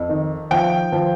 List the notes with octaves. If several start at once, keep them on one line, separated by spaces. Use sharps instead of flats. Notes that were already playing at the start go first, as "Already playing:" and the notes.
Already playing: F2
D#3
F3 G5
F3